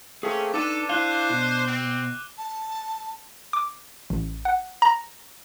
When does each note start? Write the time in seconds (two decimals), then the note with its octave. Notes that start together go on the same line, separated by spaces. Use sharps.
0.23 A3 A#3 C4 C#4 G#4
0.54 D4 D#4 A4 B4 A5 D6 D#7
0.89 E4 C5 F5 F#6 G7
1.30 B2
1.68 C4
2.38 A5
3.53 D6
4.10 A1
4.45 F#5
4.82 A#5